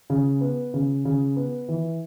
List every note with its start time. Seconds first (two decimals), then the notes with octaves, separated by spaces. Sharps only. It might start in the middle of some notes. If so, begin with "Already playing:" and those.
0.10 C#3
0.41 B3
0.74 C#3
1.05 C#3
1.36 B3
1.69 E3